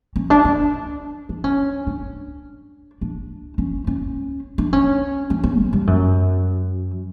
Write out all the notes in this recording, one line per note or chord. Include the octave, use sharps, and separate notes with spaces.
C#4
D4
D4
D4
C#4
D4
D4
C#4
C#4
D4
C#4
C#4
C#4
F#3
G2
F#2